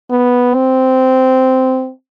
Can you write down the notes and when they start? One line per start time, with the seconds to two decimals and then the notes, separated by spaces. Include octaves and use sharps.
0.10 B3
0.54 C4